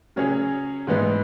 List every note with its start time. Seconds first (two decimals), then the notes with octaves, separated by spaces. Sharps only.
0.16 C#3 F#3 C#4 G#4 C#5
0.87 G#2 E3 G#3 B3 D#4